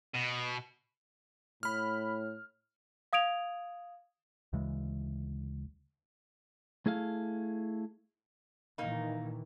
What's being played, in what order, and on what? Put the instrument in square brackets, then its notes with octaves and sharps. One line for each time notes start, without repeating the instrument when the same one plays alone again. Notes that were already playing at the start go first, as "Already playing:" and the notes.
[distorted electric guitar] B2
[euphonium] A2 [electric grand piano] B5 F6
[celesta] F5 D#6 G#6 D7 F7
[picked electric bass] D2 C#3 E3 G#3
[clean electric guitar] A3 E4 G#4 A4 F5
[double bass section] A#2 D#3 E3 [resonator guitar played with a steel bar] A#3 D#4